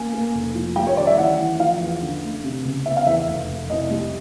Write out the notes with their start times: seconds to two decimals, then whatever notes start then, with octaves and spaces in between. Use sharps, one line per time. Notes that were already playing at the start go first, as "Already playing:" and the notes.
Already playing: A#3 G#5
0.13 A#3
0.34 F1
0.55 F3
0.76 G3 G5
0.87 C#5
0.97 D#3 D5
1.07 E5
1.18 E3 F#5
1.38 E3
1.60 F3 F5
1.81 E2
2.02 D3
2.23 A3
2.44 C3
2.65 C#2
2.86 B3 E5
2.96 F5
3.06 E2 E5
3.28 F1
3.48 F1
3.70 C2 D#5
3.90 G3